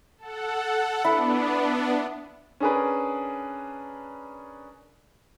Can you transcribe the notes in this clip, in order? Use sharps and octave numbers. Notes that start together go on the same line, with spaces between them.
A4 F#5
B3 D4 E4
C#4 D4 G#4 A#4 B4